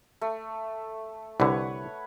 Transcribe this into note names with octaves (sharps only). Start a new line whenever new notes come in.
A3
C2 D3 B4 C#5 F#5